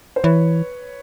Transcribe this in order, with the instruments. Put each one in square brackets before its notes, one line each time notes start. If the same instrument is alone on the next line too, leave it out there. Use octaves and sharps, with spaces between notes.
[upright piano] C5
[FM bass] E3 [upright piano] B4 C#5